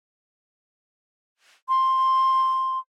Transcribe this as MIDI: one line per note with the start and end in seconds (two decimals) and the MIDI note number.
1.69 2.79 84